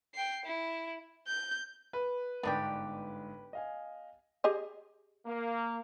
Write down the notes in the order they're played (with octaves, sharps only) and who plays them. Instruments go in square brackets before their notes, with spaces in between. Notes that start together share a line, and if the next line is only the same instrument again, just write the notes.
[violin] G5 C7
E4
G6
[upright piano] B4
[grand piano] G1 G#2 [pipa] B3 D4 G4
[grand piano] D#5 F5 G#5
[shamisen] G4 G#4 D#5
[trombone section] A#3